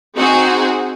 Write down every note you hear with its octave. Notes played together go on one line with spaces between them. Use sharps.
C4 D#4 F#4 G#4